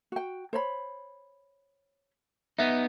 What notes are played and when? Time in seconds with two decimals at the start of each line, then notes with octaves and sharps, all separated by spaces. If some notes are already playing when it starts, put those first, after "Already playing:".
0.12 F#4 G5
0.53 C5 C#5 B5
2.58 B3 D#4 E5